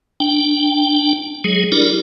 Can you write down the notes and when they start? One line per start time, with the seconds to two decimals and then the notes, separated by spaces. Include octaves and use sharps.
0.20 D4 G5
1.44 F#3 G#3 G#4
1.72 D4 E4 G4 A#4 D5